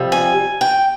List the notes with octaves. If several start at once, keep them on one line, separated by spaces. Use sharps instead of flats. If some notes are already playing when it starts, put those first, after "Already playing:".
Already playing: F2 C3 G3
G#5
G5